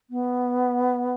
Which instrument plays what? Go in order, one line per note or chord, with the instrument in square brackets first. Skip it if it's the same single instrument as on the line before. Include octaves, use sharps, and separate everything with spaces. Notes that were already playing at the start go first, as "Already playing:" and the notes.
[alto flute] B3